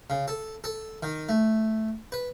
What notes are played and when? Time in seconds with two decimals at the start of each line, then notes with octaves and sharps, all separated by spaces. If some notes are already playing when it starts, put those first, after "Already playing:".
0.10 C#3
0.28 A4
0.64 A4
1.03 D#3
1.29 A3
2.12 B4